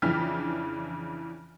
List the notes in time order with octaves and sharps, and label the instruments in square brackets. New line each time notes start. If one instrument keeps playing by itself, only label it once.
[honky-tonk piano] F2 C#3 E3 D4 F6 B6